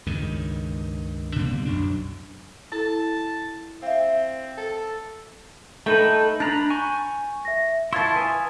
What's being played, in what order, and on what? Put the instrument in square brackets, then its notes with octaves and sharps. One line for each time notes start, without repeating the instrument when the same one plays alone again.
[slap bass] C#2 G2 D#3
B2 D3 G3 A#3
B1 F#2 D4
[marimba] E4 A4 [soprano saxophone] A5
[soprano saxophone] C4 [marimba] E5 F5
[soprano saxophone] A4
[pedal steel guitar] A3 D#4 B4 [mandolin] A4 G5
[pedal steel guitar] D4 A#5 B5 [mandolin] F#6 [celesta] A6
[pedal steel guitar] G#5 C#6 G6
[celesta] E5 A#6
[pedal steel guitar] E4 C6 E6 [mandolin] F4 A5 [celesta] C#6 G#6 A6
[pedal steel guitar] B4 G#5 D#6